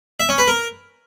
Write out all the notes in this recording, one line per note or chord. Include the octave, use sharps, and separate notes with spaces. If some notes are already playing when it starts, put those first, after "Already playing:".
E5
C#4
B4
A#4